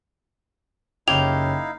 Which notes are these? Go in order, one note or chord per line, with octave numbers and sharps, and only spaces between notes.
F#1 C#4 D#4 E4 G4 F5 G#6 F7